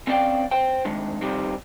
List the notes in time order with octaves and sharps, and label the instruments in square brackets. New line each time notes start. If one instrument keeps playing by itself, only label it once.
[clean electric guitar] C4 C#4 C5 D5 F5 G5
C5 G5
D3 D#3 G#3
F2 C3 D#3 G3 C4